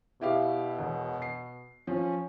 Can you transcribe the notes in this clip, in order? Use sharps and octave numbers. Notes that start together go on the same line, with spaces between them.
B2 E4 G4 F5
E1
C7
F3 C#4